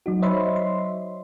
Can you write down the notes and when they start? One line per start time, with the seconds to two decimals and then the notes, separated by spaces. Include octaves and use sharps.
0.06 F#3 D#4 F#4
0.22 C5 C#5 D#5 E5 B5 C6
0.56 C6